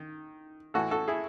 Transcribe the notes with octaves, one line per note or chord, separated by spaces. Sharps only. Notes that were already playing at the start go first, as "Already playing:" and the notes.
Already playing: D#3
A2 E3 F#4 A4
F#4 A4
E4 G#4